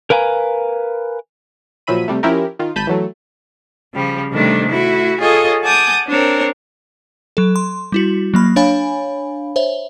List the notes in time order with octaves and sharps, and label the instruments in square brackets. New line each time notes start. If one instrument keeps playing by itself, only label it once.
[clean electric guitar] A#4 B4 F5 G#5 A#5
[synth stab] A#2 F3 F#3 E5 B5 D#7
C3 G3 A3
F3 C#4 E4 G4 A#4
D#3 F4
G#1 A5 B5 G6 B6 D#7
E3 F#3 A3
[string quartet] C#3 F3 G3
C3 D#3 G3 A3 D4
A3 E4 F#4
F4 G#4 A4 C#5 D#5
F#5 G#5 A5 D6 D#6 G6
C4 D4 A#4 C#5
[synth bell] F#3 A4
C6
G3 E4 F#4
F#3 A#3 B5
D4 C#5 F5 G#5 B5
C5 C#5 E5